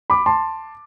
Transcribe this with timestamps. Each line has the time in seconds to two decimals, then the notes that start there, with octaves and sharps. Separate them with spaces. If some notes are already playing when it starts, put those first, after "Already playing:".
0.10 B5 D6
0.26 A5 C6